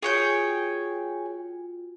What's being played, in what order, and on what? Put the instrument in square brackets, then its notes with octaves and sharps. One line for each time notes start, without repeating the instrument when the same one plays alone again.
[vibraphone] F4 F#4 [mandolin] G#4 C#5 G5